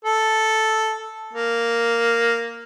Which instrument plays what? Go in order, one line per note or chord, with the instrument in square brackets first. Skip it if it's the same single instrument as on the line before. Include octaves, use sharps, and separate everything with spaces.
[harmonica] A4
A#3